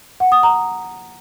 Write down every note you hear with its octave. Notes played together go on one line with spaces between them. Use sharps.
F#5
D#6
A#5